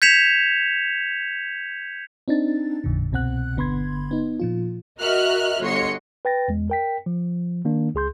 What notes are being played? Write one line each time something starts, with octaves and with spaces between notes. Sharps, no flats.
G6 G#6 B6 C#7 E7 F7
C4 D4 D#4 A6
A1 F2 A#2 D3
C2 B2 C4 F#5 F#6
G1 D3 B3 B5 C6 G#6
B3 D#4
A#2 F3 F4
F#4 A#4 D#5 E5 F6 F#6
G1 F#4 C#5 D#5 C6 C#7
B4 G5 A6 A#6
E2 G#3
A#4 G5 B6
F3
D#3 A#3 D4
C#2 G#4 C6 G6